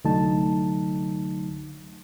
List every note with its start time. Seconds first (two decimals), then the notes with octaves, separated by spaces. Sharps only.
0.04 C2 D3 F#3 A3 D#4 A5